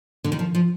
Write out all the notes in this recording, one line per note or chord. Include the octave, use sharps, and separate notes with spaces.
D3
D#3
F3
F3